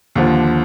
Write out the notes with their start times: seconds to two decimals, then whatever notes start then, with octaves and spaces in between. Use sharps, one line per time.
0.15 D#2 D3 F3